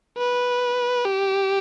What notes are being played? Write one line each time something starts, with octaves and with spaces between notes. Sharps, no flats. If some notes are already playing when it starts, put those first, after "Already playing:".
B4
G4